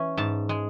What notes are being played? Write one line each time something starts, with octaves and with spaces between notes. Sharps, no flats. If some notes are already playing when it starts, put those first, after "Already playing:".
Already playing: E3 C#4
G#2 A5
G#3